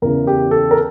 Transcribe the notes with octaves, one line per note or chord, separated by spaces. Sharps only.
E2 C#3 E3 A#4
G4
A4
A#4